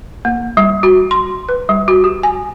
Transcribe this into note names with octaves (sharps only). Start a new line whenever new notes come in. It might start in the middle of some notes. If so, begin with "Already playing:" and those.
A#3
G3
F#4
C6
B4
G3
F#4
G4
G#5